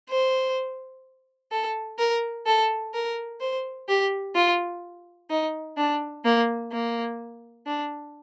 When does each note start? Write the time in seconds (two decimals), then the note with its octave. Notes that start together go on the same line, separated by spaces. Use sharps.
0.10 C5
1.51 A4
1.99 A#4
2.46 A4
2.94 A#4
3.41 C5
3.88 G4
4.35 F4
5.30 D#4
5.77 D4
6.25 A#3
6.72 A#3
7.66 D4